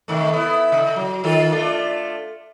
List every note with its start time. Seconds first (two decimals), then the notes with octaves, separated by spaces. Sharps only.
0.08 C3 D#3 A3
0.33 B3 E4
0.72 C#3
0.96 F#3
1.24 D#3 F4 A4
1.52 A3 D4 F4